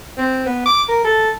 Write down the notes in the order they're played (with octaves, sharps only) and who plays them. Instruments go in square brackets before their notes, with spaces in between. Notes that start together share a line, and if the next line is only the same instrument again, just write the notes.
[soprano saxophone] C4
B3
D6
A#4
A4